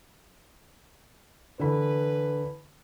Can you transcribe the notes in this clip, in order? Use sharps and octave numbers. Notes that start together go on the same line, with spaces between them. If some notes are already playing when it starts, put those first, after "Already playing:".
D3 E3 B4 B5